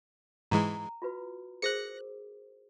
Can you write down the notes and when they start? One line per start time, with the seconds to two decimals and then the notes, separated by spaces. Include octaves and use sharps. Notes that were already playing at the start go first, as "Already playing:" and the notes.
0.51 G#2 E3 G#3 A#5
1.02 F4 F#4 B4
1.62 G#4 A#4 C5 F#6 A#6 C#7